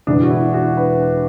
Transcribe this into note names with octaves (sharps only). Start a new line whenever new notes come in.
E1 E2 E3 D4
F#4
E4
F#4
B4